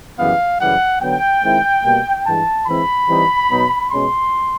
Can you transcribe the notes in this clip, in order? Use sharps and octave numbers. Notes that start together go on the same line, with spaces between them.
F#2 C#3 E3 G3 B3 F5
F#2 C#3 E3 G3 F#5
D3 F#3 B3 G5
D#3 G#3 C4 E4
B2 G3 A#3
G2 E3 G#3 A5
E3 G#3 C4 E4 B5
E3 G3 C4 D#4
B2 F#3 B3 D#4
B2 G#3 C#4 C6